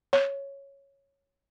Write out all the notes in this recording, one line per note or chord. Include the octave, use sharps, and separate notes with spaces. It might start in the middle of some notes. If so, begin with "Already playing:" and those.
C#5